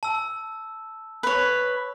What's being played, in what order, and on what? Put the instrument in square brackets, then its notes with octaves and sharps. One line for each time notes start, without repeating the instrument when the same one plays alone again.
[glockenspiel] A5 E6
[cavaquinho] B4 C#5